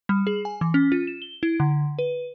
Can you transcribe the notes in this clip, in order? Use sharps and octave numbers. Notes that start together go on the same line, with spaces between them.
G3
G#4
G#5
E3
C#4
F4
E7
G7
E4
D3
B4